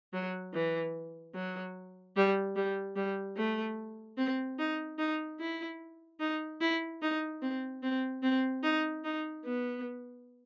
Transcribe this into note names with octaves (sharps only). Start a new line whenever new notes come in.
F#3
E3
F#3
G3
G3
G3
A3
C4
D#4
D#4
E4
D#4
E4
D#4
C4
C4
C4
D#4
D#4
B3